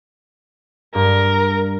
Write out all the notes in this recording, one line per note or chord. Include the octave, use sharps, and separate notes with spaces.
G2 A#4